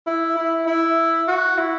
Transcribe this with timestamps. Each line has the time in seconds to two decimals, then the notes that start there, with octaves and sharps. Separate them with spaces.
0.07 E4
0.36 E4
0.67 E4
1.28 F#4
1.58 E4